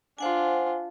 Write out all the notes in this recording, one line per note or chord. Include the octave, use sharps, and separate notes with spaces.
D4 F4 C5 F#5 G#5